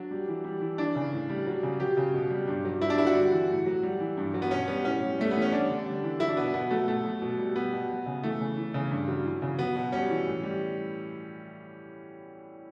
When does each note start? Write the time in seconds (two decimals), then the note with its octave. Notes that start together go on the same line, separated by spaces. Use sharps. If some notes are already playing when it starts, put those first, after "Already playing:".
Already playing: F#3 D4
0.11 G3
0.28 E3
0.44 G3
0.61 E3
0.78 E3 D4
0.95 C#3
1.12 A2
1.30 G3
1.46 F#3
1.63 C#3
1.80 F#3 G4
1.97 C#3
2.14 B2
2.30 G3
2.48 G2
2.65 F#3
2.81 G3 E4
2.90 D4
2.98 D3 E4
3.07 F#4
3.15 G3
3.32 E3
3.49 A2
3.66 F#3
3.83 G3
4.00 E3
4.17 G2
4.34 F#3
4.42 B3
4.51 B2 C#4
4.68 G3 B3
4.85 A2 C#4
5.02 G3
5.18 G3 A3
5.31 E3 B3
5.42 C#4
5.52 G3 D4
5.69 D3
5.86 G3
6.03 E3
6.20 F#3 E4
6.29 D4
6.37 B2 B3
6.54 B2 B3
6.71 F#3 A3
6.88 B2 A3
7.05 F#3
7.22 B2
7.38 G3
7.55 G3 B3
7.73 B2
7.90 F#3
8.06 C#3
8.23 E3 A3
8.40 C#3
8.57 E3
8.74 C#3
8.91 G2
9.08 F#3
9.25 E3
9.42 C#3
9.59 F#3 B3
9.76 B2
9.92 G3 C#4
10.10 E3
10.26 A2
10.43 G3